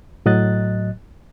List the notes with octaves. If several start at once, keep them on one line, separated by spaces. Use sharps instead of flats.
A2 F#3 D#5 F#6 A6